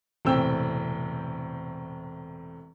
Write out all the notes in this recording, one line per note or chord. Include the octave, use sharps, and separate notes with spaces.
E1 A2 C3 C4 G5 E6